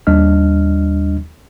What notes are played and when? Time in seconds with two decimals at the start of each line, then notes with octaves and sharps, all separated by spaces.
0.07 D#2 G3 D4 D#5 F6